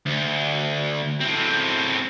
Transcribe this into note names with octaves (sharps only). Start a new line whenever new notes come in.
D2
A2 C4